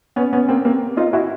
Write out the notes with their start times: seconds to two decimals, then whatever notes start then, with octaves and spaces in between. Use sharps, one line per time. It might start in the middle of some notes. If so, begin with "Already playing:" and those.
0.16 B3 C#4
0.33 B3 C#4
0.48 A#3 C4
0.65 A#3 C4
0.97 D#4 F4
1.13 E4 F#4